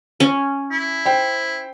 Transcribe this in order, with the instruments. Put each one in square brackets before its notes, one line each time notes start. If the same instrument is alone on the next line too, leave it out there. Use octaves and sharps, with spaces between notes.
[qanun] C#4
[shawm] E4
[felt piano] C5 G5